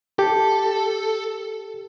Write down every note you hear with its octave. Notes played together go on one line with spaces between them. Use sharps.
G4 A4